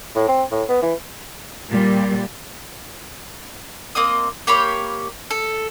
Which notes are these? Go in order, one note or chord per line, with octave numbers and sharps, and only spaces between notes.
A2
C4
A2
B3
E3
A#2 G3
A#3 C4 D#5 D#6
A#3 G4 C#5 B5
A4